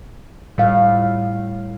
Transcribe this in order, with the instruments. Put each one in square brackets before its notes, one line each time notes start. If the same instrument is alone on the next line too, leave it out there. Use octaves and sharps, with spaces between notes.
[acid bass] A2 [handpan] G3 F5